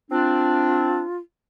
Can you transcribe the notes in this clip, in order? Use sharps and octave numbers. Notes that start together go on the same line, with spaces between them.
C4 D4 F4